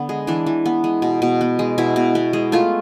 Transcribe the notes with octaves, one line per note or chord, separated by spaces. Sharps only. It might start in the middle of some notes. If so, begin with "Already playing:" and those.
Already playing: D3 B3
G#3
E3 D4
E3
B3
G#3
B2
B2
B3
G#3
B2 E4
B2
B3
G#3
A3 F4